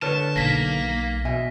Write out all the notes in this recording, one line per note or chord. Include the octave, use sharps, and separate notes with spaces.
D3 B4 C#5 A5 F6
B1 A#3 A#6 B6
B2 E5 G#5